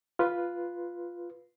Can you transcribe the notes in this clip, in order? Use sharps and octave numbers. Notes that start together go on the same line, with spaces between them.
F4 B4